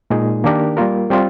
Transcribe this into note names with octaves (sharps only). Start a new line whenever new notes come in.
A#2 G#3 D#4 G#4
D#3 A#3 D4 G4 A#4
G3 A#3 F4 A#4
G3 C4 F4